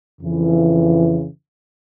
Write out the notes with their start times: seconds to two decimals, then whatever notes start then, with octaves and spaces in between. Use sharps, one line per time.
0.21 F2 C#3 E3